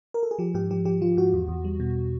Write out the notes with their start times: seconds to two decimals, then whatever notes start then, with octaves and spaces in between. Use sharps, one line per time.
0.14 A#4
0.23 A4
0.31 G#4
0.39 F3 G4
0.54 G#2 G4
0.70 F3 G4
0.85 F3 G4
1.01 F3 F4
1.17 G#2 F#4
1.33 E2
1.48 E2
1.64 G3
1.80 B2